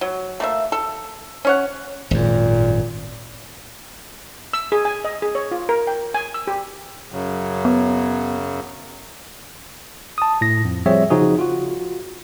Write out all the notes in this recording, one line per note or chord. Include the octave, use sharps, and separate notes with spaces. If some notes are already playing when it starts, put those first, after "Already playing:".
F#3
A3 A#3 E5
A4
C#4 C#5 F#5
G#1 F#2 A#2
E6
G#4
G#5
D#5
G#4
C#5
F4
A#4
G5
G#5
E6
G4
F#2 C#3 F#3
B3
A5 D#6
A2 A#6
F2
F3 G3 C4 G#4 C#5 E5
C#3 F3 D#4 F#4 G#4
F4 F#4